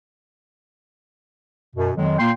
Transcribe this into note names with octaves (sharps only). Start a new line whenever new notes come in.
F#2 B2
F2 D#3 F#3 G#3
A#2 A#3 G5 C6